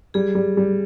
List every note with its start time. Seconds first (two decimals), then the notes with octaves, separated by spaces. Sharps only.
0.14 G3 G#4
0.35 G3
0.57 G3